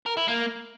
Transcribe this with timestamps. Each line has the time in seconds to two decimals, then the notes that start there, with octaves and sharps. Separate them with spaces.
0.06 A#4
0.17 E4
0.28 A#3